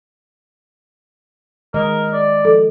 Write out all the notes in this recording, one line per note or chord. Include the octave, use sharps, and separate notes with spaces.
D#3 G#3 A#4 D#5
D5
F3 A4